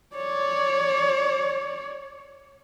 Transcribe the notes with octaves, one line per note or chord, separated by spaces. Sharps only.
C#5 D5